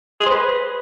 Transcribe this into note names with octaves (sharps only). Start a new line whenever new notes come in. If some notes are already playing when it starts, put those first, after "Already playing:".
G#4
C5
B4